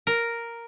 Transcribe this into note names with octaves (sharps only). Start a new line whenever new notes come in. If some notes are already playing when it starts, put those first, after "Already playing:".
A#4